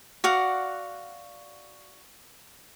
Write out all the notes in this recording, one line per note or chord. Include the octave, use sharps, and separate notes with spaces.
F#4 D5 F5 F#5